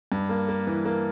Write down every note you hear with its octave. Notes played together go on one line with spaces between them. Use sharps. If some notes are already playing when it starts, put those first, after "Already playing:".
G2
A#3
A#3
E3
A#3